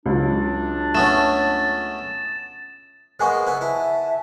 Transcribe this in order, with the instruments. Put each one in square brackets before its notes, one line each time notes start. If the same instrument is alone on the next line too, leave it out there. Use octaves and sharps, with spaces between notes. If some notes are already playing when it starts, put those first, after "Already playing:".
[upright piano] C#2 F#3 [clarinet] D4
[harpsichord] A3 B3 C#4 [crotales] A6 E7
[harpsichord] G#3 A#3 B3 [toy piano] C5 G#5 C#6
[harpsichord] B3 E4 [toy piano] C5
[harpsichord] E4 [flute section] E5 G#5 A5